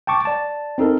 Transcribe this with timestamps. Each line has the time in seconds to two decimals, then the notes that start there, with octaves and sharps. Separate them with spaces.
0.07 G5 A5 C#6 D6
0.25 D5 A5
0.78 C4 D#4 A4 A#4